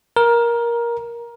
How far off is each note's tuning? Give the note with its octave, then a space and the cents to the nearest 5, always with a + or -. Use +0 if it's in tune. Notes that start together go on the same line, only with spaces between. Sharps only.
A#4 +15